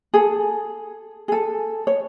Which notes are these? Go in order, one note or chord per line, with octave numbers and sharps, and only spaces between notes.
G#4 A4
G#4 A4
C#5